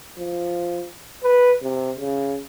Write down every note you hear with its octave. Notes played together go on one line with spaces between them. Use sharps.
F3
B4
C3
C#3